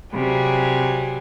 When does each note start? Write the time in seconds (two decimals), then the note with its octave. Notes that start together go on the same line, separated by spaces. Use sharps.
0.13 C3 F#3 G3 G#4